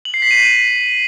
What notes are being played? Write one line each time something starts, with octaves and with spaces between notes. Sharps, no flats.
F#7
C7
B6
D#7